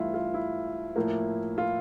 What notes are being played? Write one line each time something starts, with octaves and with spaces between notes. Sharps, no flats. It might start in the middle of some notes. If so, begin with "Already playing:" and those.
Already playing: G2 E3 A3 E4 F4
F4
E4
A2 F3 A#3
F4